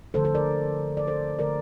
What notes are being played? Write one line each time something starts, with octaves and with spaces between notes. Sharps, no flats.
D3 F3 A3 A4 C5
A4 C5
A#4 D5
D5
A4 C5
D3 A3 A#4 D5